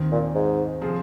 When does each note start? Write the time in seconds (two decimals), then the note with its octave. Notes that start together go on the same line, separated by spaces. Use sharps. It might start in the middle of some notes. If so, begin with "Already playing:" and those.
Already playing: D#2 D#3 C4
0.12 A#2
0.35 G#2
0.81 C3 F3 C4 G#4